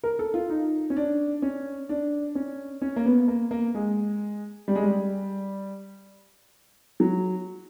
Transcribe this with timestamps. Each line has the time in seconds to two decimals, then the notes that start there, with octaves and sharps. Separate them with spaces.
0.04 A#4
0.19 A4
0.34 F4
0.50 D#4
0.90 C#4
0.97 D4
1.42 C#4
1.89 D4
2.35 C#4
2.82 C#4
2.96 A#3
3.06 B3
3.28 A#3
3.51 A#3
3.75 G#3
4.68 G3
4.75 G#3
4.83 G3
7.00 F#3